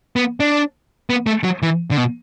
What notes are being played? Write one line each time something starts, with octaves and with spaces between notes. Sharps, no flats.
B3
D4
B3
A3
F#3
E3
D3
B2